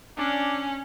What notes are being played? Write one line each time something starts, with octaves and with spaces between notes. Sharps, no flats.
C#4 D4